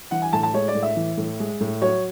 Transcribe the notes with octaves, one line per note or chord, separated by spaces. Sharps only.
E3 F#5
G#5
A2 A5
A5
G#3 C#5
D5
A2
E5
E3
A2
G#3
A2
F#3 C#5